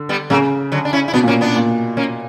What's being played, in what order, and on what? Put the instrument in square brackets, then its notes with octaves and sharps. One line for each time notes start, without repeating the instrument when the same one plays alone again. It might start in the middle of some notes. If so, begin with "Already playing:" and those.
Already playing: [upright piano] D3
[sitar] G3 B3
[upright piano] C#3 [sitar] F#3 A#3
[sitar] D3 F#3
D4
C#4 E4
E4
[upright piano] B2 [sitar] B3 D4
[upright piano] A#2
[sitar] A#3 C#4
B3 D4
[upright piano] A#2
[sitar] A#3 C#4